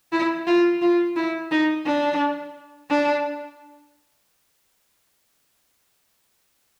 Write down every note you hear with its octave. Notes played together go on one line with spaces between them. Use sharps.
E4
F4
F4
E4
D#4
D4
D4